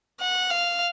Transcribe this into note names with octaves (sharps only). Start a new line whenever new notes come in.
F#5
F5